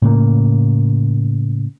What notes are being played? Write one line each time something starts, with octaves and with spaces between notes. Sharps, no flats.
A2 C#3 A#3